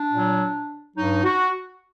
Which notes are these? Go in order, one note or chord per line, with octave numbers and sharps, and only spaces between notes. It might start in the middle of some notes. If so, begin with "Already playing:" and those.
Already playing: D4
A#2 F#3
G2 F#3 D#4
F#4